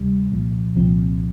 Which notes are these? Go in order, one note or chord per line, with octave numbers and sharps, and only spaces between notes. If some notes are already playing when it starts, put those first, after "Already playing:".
Already playing: D2 C3 G3
C2 A#2 F3
C2 A#2 F3 C4